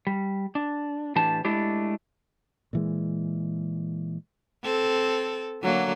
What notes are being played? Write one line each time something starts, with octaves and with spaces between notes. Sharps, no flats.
G3
D4
A2 E3 D4 G4 A5
G#3 A3 D4 E4 G4
A#2 E3 G#3
C4 A4
D3 F#3 A#3